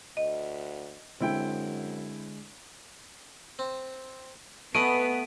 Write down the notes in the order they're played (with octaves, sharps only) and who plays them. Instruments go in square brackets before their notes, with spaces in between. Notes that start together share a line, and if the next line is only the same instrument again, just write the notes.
[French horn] D2 [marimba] D#5
[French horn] F#2 [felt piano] D3 G#3 [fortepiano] C4 E4 G5
[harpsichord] C4
[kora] A3 [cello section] B3 [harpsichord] B4 D#5 G#5 [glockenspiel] D7 D#7